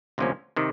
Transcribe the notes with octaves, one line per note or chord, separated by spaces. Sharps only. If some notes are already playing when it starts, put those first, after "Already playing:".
D2 C3 F3 A#3 C#4
C3 D#3